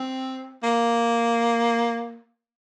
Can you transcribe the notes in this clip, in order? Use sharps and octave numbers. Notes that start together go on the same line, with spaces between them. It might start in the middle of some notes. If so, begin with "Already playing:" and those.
Already playing: C4
A#3